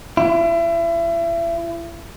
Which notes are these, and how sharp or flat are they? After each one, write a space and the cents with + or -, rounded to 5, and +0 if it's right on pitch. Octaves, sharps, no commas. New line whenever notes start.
E4 +35